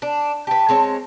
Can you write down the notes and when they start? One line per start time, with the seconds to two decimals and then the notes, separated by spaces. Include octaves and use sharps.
0.02 D4
0.47 G4 B4 A5
0.69 G#3 C4 C#5